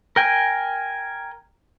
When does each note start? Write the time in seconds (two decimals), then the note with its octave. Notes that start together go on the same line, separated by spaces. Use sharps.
0.16 A#4 G5 G#5